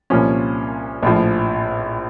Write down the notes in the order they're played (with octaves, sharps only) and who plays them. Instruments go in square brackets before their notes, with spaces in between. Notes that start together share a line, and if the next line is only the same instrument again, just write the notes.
[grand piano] C2 A#2 F3 C#4
A#1 A2 F3